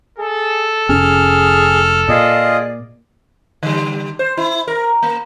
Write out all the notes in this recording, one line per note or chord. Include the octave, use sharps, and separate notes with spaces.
G#4 A4
F1 C#4 G#4 F6
A#2 F4 G#4 D5 D#5
D3 G3
C5
E4
A#4
A#3